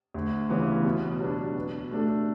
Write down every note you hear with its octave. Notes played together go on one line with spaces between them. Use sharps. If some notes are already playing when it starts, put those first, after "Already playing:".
D2
C#3 E3 B3
B2
F#3 B3 D4
B2
A3 D4 A4